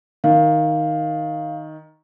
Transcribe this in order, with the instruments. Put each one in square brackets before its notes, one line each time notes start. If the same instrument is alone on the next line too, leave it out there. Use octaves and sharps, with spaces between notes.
[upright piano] D#3 [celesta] F5